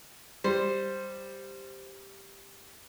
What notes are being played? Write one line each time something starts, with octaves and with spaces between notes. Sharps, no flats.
G3 C5